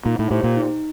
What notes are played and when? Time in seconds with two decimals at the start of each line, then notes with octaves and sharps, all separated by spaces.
0.05 A#2 D#4
0.19 A2
0.30 A2 G4 C5
0.44 A#2
0.56 D#4